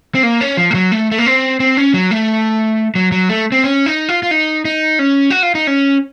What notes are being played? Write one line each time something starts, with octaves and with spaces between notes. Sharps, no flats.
C4
A#3
C#4
F3
A3
F#3
A3
A3
A#3
C4
C4
C#4
F#3
A3
F#3
F#3
A3
C4
C#4
D#4
F4
F4
D#4
D#4
C#4
F#4
F4
D#4
C#4